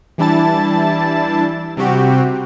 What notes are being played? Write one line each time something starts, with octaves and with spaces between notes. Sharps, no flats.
E3 G3 D4 E4 A5 A6
C3 G3 C4 F#4 G4